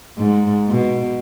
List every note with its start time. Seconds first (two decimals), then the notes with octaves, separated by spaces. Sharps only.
0.18 G#2
0.69 B2